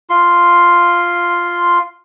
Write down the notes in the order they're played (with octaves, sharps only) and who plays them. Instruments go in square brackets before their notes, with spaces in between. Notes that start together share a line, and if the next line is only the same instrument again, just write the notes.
[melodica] F4 C6